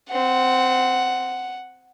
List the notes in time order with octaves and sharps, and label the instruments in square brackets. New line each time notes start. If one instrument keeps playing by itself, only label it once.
[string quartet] C4 [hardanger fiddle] F#5